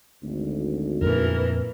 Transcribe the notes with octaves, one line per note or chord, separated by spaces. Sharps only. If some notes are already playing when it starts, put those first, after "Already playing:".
G#1 D2
F2 A#2 E3 A#4